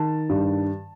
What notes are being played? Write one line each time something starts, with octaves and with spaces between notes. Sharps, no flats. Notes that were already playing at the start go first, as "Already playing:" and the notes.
Already playing: D#3 A5
G2